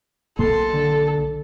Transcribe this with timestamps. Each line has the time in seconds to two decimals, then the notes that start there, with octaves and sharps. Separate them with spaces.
0.39 B1 B2 A#3 A4 C6
0.73 D3